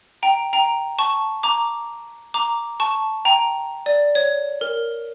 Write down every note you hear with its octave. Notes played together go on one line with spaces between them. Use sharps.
G5 A#5
G5 A#5
A5 C#6
A#5 D6
A#5 D6
A5 C#6
G5 A#5
D5
C#5
A#4